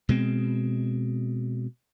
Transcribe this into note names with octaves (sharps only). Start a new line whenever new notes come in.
B2 G#3 C4